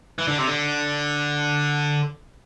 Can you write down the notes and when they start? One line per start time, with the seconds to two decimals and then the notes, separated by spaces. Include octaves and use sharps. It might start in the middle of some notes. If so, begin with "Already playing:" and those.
0.18 E3
0.28 D3
0.38 C3
0.47 D3